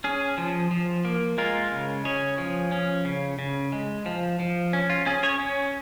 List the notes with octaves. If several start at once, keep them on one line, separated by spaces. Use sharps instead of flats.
C#4 G#4
F3
F3
A#3
G#3 F4 A#4
C#3
C#4 G#4 C#5
F3
C#4
C#3
C#3
G#3
F3
F3
C#4
F4
C#4 G#4
G#4 C#5
C#4